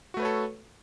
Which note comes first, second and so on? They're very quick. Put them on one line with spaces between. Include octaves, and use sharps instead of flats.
F#4 A3 B4 C#5 A4